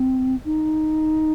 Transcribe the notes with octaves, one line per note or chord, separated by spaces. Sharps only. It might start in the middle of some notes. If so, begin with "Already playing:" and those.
Already playing: C4
D#4